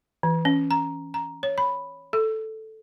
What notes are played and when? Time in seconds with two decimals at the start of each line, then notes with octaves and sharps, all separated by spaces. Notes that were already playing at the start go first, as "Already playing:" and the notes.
0.23 E3
0.45 C#4
0.71 A#5
1.14 A#5
1.43 C#5
1.58 B5
2.13 A4